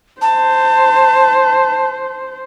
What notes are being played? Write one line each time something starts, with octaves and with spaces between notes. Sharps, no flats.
C5 A5